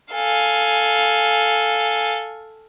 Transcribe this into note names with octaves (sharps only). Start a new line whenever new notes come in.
A4 F5 G#5